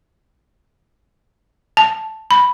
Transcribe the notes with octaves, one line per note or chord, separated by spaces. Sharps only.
A5
B5